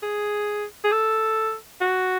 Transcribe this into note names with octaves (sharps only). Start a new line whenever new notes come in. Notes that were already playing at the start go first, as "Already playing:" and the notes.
G#4
G#4
A4
F#4